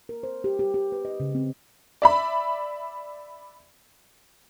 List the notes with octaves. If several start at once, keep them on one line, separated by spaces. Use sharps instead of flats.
A#4
C5
G4
G4
G4
B4
D#5
C#3
C4
D5 E5 B5